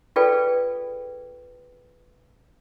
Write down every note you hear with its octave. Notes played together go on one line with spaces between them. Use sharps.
F4 G#4 A4 B4 D5 G5